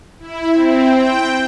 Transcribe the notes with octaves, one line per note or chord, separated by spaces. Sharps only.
E4
C4
G5